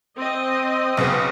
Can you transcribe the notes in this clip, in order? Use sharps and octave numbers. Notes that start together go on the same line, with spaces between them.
C4 D#5
B1 C#3 B3